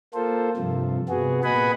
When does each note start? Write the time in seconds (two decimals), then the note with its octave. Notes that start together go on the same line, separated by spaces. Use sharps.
0.14 A#3 F4 A4 C5
0.56 G2 C3 F3
1.09 C3 B3 F#4 G#4
1.44 A#2 B4 D#5 F#5 G#5 B5